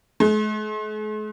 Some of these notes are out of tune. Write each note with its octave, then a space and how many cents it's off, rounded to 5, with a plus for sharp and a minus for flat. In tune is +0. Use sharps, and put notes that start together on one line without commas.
G#3 +45